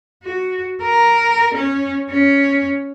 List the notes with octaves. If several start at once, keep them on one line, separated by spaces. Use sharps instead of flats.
F#4
A#4
C#4
C#4